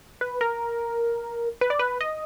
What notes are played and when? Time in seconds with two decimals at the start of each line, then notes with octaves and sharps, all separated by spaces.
0.21 B4
0.41 A#4
1.61 B4
1.70 D5
1.79 B4
2.01 D#5